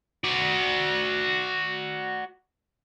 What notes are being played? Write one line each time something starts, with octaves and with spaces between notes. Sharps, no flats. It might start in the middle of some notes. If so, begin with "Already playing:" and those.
F#4 D5